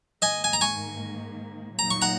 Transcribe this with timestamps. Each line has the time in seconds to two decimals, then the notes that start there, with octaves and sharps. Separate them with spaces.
0.22 G#2 D#3 A#3 D#5 G#5
0.44 G#5
0.53 A#5
0.61 G#5 C#6
1.78 A#2 F#3 A#3 D#4 A#5
1.91 C#6
2.02 F#5 A#5